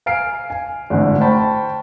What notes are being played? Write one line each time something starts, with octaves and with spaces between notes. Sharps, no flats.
F5 G#5 F6 C7 D7
G#5
G#1 A2 D3
C5 G5 A5 B5 C#6